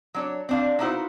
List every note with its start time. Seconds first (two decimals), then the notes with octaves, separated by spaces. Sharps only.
0.14 F#3 D4 C#5
0.49 C4 D4 F5
0.79 A#3 B3 D#4 E4 F#4 C5